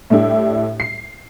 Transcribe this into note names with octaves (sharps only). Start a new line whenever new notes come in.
A2 A3 D4 E4 G4
C7